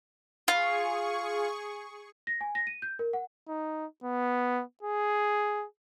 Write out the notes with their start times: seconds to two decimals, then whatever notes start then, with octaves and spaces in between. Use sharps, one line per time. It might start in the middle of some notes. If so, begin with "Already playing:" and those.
0.48 F4 G#4 C#6
2.27 A#6
2.41 G#5
2.55 A#6
2.67 D#7
2.82 G6
2.99 A#4
3.13 F#5
3.48 D#4
4.04 B3
4.83 G#4